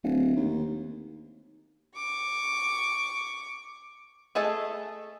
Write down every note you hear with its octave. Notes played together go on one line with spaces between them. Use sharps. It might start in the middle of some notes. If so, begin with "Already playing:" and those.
D1
D#2
C#6 D6
A3 G#4 A4 D#5 A5